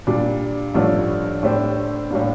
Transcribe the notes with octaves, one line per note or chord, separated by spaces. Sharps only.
A#2 G3 D4
A1 G2 F3 A3 D4
A2 A3 D4 G4 C5
A2 G3 A#3 D4